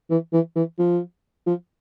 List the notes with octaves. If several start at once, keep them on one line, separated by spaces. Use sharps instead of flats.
E3
E3
E3
F3
F3